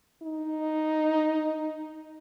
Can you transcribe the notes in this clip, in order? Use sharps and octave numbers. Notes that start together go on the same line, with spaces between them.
D#4